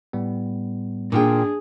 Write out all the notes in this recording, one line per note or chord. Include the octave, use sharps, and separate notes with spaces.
A2 G3 B3
A#2 D4 F4 G#4 G5